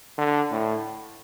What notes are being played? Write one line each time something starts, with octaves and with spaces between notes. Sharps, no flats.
D3
A2